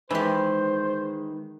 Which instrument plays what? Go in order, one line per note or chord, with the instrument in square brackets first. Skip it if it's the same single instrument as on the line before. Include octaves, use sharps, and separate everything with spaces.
[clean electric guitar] D#3 B4 [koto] E3 G4 [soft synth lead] G#3 [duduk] C5